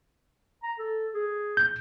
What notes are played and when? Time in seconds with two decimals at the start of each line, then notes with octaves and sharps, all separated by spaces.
0.63 A#5
0.79 A4
1.15 G#4
1.57 G6